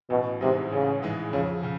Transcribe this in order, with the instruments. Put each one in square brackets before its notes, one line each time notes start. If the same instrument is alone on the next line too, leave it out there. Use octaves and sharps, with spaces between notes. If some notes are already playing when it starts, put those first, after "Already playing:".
[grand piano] A1 [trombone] B2
[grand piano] G#2 E3 G#3 [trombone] C3
[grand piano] A1 [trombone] C#3
[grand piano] G#2 E3 G#3
[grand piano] F2 [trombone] C#3
[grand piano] C#3